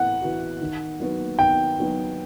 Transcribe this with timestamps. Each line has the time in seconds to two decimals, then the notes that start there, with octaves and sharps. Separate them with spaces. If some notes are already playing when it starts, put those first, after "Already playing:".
Already playing: A2 E3 B3 F#5
0.21 E3 B3 F#4
0.61 D#3
1.00 F#3 B3 D#4 F#4
1.39 D#3 G5
1.78 F#3 B3 D#4 F#4